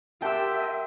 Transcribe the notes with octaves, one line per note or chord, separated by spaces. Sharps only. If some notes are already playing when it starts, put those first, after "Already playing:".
G4 A#4 E5 F#5 G5 A5 C6 E6